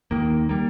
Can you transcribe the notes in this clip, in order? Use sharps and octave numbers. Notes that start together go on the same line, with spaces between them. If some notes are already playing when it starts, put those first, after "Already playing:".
D#2 D#3 A#3
G3 A#3